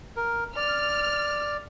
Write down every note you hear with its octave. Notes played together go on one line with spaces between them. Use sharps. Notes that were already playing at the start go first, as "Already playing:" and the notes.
A#4
D5 F6